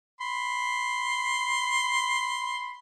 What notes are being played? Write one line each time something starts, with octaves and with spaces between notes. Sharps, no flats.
B5 C6